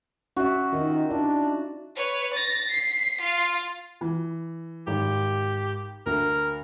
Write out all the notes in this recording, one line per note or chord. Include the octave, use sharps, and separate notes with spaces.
C#4 F#4 E5
D#3 D#4 F4
D4 E4 D5
B4 C#5
A6 A#6
B6 C7
F4 F5
E3
G#1 G4
D2 A#4